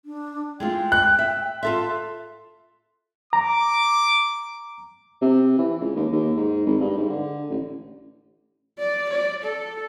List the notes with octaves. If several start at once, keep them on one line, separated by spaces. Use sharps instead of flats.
D4
G#3 A3 F4 G5
F#6
E5
F4 A4 E5 C6
A#5 D6
C3
E3
C#2
D#2
D#2
G#2
G#1
G2
G#2
D3
A1
D5
D5
A4